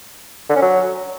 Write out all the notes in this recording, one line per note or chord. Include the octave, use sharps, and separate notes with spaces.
D3
C#4
F#3